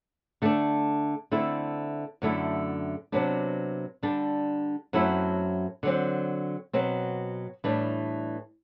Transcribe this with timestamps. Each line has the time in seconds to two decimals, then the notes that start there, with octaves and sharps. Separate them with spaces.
0.42 D3 A3 D4
1.32 D3 A3 C4 E4
2.22 F#2 D3 A3 E4
3.12 C3 F#3 B3 D4
4.03 D3 G3 D4
4.93 F#2 F#3 A3 C4 E4
5.83 D3 F#3 C4
6.73 B2 F#3 C4
7.64 A2 E3 G3 D4